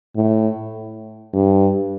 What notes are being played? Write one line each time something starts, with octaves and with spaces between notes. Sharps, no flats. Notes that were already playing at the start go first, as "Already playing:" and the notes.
A2
G2